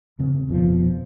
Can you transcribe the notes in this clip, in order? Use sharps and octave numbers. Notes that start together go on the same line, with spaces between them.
E2 C#3 C4
D#1 F2 B2 F3